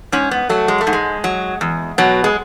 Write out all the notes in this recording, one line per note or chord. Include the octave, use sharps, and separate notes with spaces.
G#2 C#4
B3
F#3 A3
G#3
A3
G#2
G#3
F#3
E2
B2 F#3
G#3